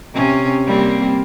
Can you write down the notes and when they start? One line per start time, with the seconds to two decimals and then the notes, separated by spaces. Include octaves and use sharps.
0.13 C3 C#4
0.66 G3 A#3 C4